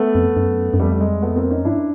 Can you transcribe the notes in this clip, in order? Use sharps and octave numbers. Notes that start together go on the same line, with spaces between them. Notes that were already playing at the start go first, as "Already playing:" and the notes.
Already playing: A3 B3
F2
F#2
F#2
F2 G3 A3
G3
G#3
A3 B3
A#3 C4
C#4 D#4
G2 D4 E4